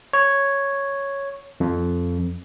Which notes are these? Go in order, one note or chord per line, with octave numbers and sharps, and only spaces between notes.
C#5
F2